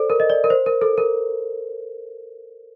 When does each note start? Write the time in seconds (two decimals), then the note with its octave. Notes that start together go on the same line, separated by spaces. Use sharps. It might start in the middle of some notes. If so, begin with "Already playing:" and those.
Already playing: A4 C5 D5
0.10 A#4
0.20 D#5
0.30 D5
0.44 A#4
0.50 C5
0.66 A#4
0.82 A4
0.98 A#4